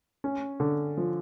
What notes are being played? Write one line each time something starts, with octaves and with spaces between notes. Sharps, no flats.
C#4
D3
F3